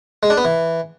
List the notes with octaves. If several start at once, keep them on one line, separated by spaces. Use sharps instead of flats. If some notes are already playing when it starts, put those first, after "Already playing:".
G#3
D4
B3
E3